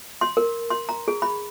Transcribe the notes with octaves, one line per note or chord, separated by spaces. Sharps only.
C6
A#4
C6
A#5
G#4
B5